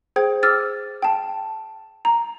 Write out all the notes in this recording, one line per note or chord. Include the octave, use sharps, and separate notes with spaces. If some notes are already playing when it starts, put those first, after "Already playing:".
G#4 C5 G5 G#6
D6 E6 F6 A6
G5 A5
A#5